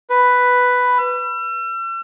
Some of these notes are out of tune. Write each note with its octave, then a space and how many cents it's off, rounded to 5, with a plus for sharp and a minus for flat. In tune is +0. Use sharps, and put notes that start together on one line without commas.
B4 +5
E6 +40